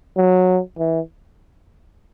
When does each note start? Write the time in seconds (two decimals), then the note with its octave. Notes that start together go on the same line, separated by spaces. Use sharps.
0.17 F#3
0.78 E3